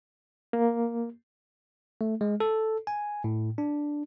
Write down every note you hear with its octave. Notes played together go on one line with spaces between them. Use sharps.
A#3
A3
G#3
A4
G#5
A2
D4